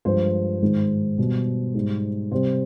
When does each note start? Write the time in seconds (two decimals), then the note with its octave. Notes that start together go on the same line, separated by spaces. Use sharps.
0.05 G2 F3 G#3 C5
0.62 G#2 D#3 G#3
1.18 B2 G3
1.74 G#2 G3
2.31 C3 G3 C5